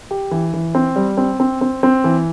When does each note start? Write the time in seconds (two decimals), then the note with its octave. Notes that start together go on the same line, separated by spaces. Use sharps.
0.11 G4
0.31 E3
0.54 E3
0.75 C4
0.96 G3
1.17 C4
1.40 C4
1.61 C4
1.83 C4
2.04 E3